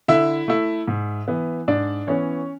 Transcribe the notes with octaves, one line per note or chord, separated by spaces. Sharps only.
D3 E4 E5
A3 E4
G#2
E3 B3
G#2 D4 D5
E3 B3 C#4 C#5